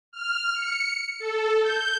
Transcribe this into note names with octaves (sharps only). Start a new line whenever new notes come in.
F6
C#7
A4
G6